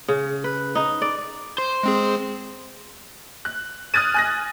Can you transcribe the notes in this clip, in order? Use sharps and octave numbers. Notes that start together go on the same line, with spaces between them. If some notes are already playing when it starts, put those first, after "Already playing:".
C#3
B4
D#4
D5
C5
G#3 C4 G#4
F#6
D#6 F6 F#6 G#6 A6 D#7
G#5 F#6 A#6